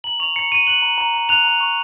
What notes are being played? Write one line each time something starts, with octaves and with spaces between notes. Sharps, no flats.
A#5 F#7
C#6 F7
A#5 C#7
C#6 D#7
F#6 F#7
A#5
A#5
A#5
F#6 F7
A#5
C#6